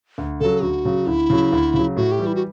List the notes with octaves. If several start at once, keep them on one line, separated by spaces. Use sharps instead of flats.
D2
C#3 F#3 A4
D2 F#4
C#3 F#3
D2 E4
C#3 F#3
D2
C#3
F#3
A2 F#4
G4
E3 G3
E4
F#4